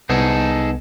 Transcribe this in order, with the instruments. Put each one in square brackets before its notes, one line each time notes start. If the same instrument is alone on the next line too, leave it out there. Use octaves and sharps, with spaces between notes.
[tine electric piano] C2 B3 [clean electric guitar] D#4 G#4 A4